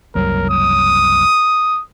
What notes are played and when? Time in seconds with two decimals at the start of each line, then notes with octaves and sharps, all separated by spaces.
0.15 F#1 C2 F#3 A#4
0.49 D#6